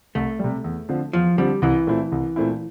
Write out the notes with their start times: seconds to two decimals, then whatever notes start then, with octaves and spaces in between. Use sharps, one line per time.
0.15 C2 A3
0.39 C3 G3
0.64 E2
0.89 D3 F3 C4
1.13 E2 F3
1.38 D3 F3 G3 C4
1.62 C2 E3
1.87 A#2 A3 C4 E4
2.12 C2
2.36 A#2 A3 C4 E4